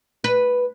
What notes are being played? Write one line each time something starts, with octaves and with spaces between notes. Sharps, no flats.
B4